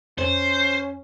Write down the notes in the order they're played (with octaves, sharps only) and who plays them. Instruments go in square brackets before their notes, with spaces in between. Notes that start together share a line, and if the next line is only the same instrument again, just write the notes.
[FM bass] F2 [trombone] C#4 [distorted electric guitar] C5